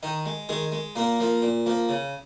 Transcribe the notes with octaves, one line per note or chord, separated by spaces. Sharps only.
D#3 D#4
G#3
D#3 G#3 G#4
G#3
A#2 A#3 A#4
F3 A#3
A#2
F3 A#3
C#3